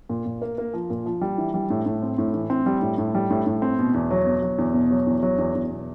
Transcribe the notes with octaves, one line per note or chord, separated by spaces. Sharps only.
A#2
A#2
A#3
A#3
F3
A#2
F3
G3
E3
G3
A2
A2
C4
A2
E3
C4
G3
A2
A2
G3
A2
A2
C4
B2
E2
F#3
B2
F#3
E2
B2
F#3
E2
F#3
E2
E2
B2